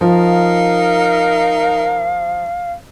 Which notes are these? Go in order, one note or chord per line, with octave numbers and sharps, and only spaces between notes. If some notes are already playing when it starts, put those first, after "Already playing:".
F3 D#4 A#4 F5